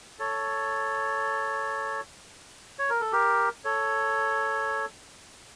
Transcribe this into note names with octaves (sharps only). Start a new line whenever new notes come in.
A4 C#5
C#5
A#4
A4
G4 A#4
A4 C#5